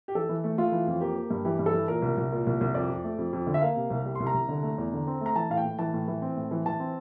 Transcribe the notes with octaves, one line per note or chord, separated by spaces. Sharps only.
G4
E3 A4
E3
A3
A3 F4
E3
F2
A#3 G4
A#3
G2
E3 G4
G2
A4
E3
A#2 A#4
C2
C2
A#2
C2
C2
F2 D5
F2
A3
F2
F2
D3
E5
A#3 F5
C3
C2
G3
C2 C6
A#5
C2
D3
A3
E2
D3
C4
A3
A#5
E3 A5
A2 F5
G5
A2
E3 A5
A2
E3
C4
A2
E3
E3 A5
C4